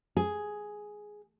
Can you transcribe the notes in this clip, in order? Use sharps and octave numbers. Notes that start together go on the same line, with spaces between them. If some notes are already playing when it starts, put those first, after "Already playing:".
G#4